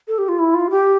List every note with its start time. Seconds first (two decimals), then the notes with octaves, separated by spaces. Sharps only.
0.07 A4
0.18 G4
0.28 F4
0.39 E4
0.54 F4
0.70 G4